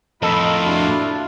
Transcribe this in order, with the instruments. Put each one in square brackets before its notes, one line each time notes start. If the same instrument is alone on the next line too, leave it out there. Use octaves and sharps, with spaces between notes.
[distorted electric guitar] F2 A2 [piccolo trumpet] F4 [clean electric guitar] A4 [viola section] A#4 D#5 B5
[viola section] D4 E4 F#4